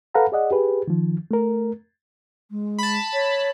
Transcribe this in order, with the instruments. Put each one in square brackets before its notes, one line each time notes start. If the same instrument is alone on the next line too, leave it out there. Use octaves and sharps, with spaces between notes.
[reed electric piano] A4 B4 F5 F#5 A#5 B5
G#4 D5 D#5 F#5
G4 G#4 B4
D#3 F3
A3 A#4
[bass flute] G#3
[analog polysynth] A5 B5
[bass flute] C#5